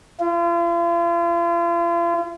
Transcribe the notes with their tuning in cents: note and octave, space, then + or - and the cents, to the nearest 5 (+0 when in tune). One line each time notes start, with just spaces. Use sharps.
F4 -40